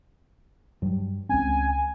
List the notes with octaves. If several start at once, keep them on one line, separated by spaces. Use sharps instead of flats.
G2 F#3
C#2 C4 C#4 G#5